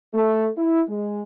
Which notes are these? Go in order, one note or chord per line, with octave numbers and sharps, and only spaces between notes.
A3
E4
G#3